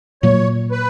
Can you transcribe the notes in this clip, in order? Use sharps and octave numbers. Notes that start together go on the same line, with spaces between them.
A#2 F#3 A#3 C#5
B4